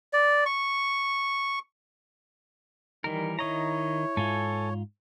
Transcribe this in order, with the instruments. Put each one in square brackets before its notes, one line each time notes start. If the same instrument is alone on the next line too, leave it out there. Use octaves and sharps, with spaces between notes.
[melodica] D5
C#6
[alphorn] D#3 [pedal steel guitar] E3 G3 A#4
[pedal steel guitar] D#3 D#5 A#5 [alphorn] E4 [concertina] C#5
[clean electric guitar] G#2 F4 [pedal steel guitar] A4 G#5